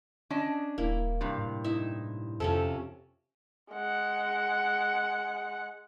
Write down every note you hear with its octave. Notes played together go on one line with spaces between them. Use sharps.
C#4 D4 D#5
D#1 A#3 E4
G2 C3
A2
D#4 E4 E5
F2 C3 F3 C#4 A4
G#3 F#5